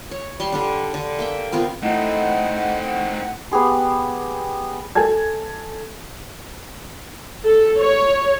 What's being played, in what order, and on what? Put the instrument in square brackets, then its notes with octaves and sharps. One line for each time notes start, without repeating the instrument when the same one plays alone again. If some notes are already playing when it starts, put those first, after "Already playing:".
[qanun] C#5
G3 C6 C#6
D3 G3 D4
D3
A#3 E5 G5
B3 C4 F4 A#4
[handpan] A3 E4 [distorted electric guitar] C4 D#4 [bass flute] D#5 [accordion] F#5
[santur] B3 G4 G#4 C6
[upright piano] A4 G#5 A5 G#6
[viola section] A4
C#5